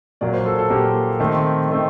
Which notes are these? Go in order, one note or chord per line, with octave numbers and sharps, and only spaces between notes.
A#2 F#3 A#3 D5
C5
A4
A4
A#2 F#3 A#3 G4
D#3 A3 C4
D#3 A3 C4